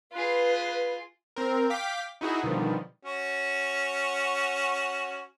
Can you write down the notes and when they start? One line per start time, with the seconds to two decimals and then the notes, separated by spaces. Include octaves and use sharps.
0.13 F4 G#4 B4
1.36 C4 A#4
1.70 F5 G5 D6 B6
2.21 D#4 E4 F#4 G#4
2.43 B2 D3 D#3 F3 G3
3.03 C#4 F#4